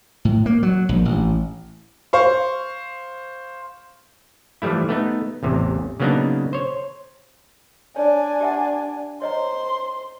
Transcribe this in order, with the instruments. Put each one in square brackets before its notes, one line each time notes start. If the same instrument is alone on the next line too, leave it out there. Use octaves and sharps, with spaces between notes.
[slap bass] A2
A#3
F#3
A#1
A1
[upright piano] C5 F5 C#6
[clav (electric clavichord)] E3 F3 G3 A3 E4
A3 B3 D#4
A1 E2 C3
C#3 F#3 A#3 B3 D4 D#4
C5 C#5
[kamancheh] D4 G#5 [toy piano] C#5 D5
[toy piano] G4 E5 F#5
[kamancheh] C5 C6 [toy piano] C#5 D#5 A#5